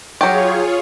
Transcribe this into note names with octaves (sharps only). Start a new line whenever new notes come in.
F#3 F4 G4 G#4 C#5